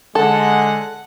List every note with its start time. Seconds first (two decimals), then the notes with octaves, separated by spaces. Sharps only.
0.15 D3 G#3 A4 F#5